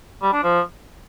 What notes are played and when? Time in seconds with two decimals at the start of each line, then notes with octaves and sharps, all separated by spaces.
0.22 G3
0.33 D4
0.43 F3